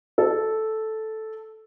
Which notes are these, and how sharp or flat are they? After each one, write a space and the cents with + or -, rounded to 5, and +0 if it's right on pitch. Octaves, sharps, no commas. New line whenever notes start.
A4 -5